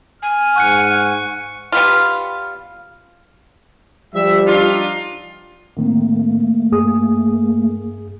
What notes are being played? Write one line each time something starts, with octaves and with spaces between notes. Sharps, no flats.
G#5 F6
G#2 F#5 C#6 F#6 C#7
G3 B3 F4
F3 G3 E5
D4 D#4 F4
A2 D#3 A3 A#3 C4
G2 G#4 D#6